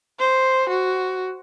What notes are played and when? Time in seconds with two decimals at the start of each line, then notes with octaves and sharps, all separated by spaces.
0.19 C5
0.69 F#4